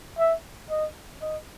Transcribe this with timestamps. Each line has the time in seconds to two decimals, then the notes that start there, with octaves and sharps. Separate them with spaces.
0.18 E5
0.70 D#5
1.22 D#5